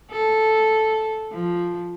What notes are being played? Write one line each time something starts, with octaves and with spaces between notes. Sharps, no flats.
A4
F3